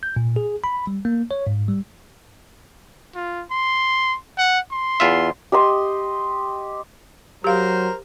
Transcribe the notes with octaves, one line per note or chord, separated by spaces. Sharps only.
G6
A#2
G#4
B5
G3
A#3
C#5
G#2
G3
F4
C6
F#5
C6
E2 F4 E5
G4 D#5 C6
F#3 G4 A#4 C5 F5